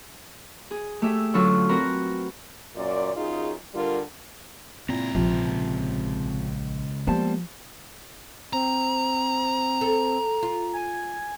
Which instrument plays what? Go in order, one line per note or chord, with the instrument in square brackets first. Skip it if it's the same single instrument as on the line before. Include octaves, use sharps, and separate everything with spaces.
[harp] G#4
A3 G4 G#4 E5
D3 F#3 C#4 F4 A4
C4 F#4 A#4 B4 A#5
[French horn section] F#2 A#2 D5
F#2 D#4 F4 G#4
D3 G3 F4 A#4
[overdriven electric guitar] C#2 A#5 [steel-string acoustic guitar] A#2 E4 [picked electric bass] C4
[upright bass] A#1 [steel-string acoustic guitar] C3 F3
[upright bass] F3 [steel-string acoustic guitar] G3 C5 A5 [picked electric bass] G#3 A#3 B3
[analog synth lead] C4 [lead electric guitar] A#5
[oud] A4
F4
[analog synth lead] G#5